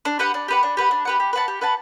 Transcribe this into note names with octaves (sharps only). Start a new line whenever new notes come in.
D4
G4 B4 F#5
D4
G4 B4 F#5
D4
G4 B4 F#5
D4
G4 B4 F#5
G4
B4 F#5 A5
G4
B4 F#5 A5